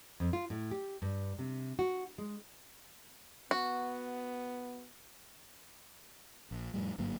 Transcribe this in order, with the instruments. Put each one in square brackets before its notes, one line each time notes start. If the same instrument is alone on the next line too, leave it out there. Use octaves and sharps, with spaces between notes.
[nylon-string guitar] F2
F4
A2
G4
G2
C3
F#4
G#3
[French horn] B3 [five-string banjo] F#4
[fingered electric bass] A#1
F2 A2 G3
G1 G#2 F#3 A#3